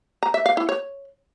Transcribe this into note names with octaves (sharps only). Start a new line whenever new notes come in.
A#5
E5
F5
E4
C#5